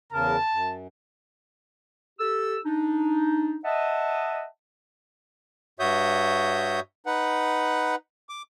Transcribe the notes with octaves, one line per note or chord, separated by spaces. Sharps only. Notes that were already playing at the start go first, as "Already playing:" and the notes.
E2 C#3 A#4 A5
F#2
G4 A4 E6
D4 D#4
D#5 E5 F#5 A5
G2 F#4 C#5 E5 D#6 G6
D#4 B4 F#5
D6